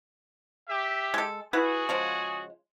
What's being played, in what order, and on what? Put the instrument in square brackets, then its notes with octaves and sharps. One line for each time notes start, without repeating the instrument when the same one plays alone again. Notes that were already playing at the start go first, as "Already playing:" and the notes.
[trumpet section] G4 E5
[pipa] G#3 A4
[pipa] E4 B4 F#5 [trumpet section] F#4 G#4
[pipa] C#3 F3 G#3